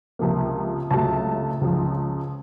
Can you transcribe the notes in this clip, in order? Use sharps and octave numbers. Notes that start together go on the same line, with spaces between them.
C#2 C3 F3 A#3
C#2 C3 F#3 A3 A5
C#2 C#3 F3